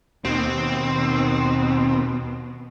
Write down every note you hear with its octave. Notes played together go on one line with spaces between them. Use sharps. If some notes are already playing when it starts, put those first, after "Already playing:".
D#2 B2 C4